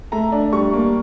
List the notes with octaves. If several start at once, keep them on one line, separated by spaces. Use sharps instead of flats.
A3 A#5
D4
G3 C#6
A#3